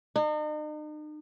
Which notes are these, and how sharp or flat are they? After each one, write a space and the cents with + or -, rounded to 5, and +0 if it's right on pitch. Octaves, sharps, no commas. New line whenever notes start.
D#4 -40